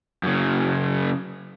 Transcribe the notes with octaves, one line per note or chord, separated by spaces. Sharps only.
F#2 C#3